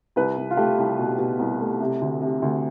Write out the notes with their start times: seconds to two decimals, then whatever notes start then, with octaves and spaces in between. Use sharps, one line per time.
0.16 C2 B4
0.38 C2
0.51 F4
0.57 A3 G4
0.78 C2
0.99 B2
1.19 B2
1.39 C2
1.60 A3
1.81 C3
2.02 D2
2.22 C3
2.42 D2